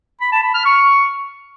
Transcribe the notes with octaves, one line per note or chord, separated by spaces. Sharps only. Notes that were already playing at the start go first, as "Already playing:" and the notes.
B5
A5
B5
F6
C#6